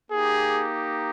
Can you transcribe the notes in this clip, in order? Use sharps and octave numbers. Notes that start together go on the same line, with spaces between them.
A#3 D#4 G4 G#4